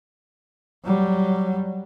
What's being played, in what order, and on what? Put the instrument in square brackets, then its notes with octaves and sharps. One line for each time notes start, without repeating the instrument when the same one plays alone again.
[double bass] F#3 G3